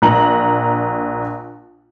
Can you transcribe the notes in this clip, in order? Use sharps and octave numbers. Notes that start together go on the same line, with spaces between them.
A#1 A#5 F#7